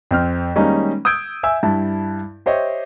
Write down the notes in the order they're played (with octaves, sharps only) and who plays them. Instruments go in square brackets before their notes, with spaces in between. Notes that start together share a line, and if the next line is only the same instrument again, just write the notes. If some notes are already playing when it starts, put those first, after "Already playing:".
[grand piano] F2 C4 F6
D#3 G3 G#3 A#3 C#4 D#4
D#6 E6 G6 G#6 D7
E5 G#5 E6
G2 E4 A5
G4 C5 C#5 D#5 E5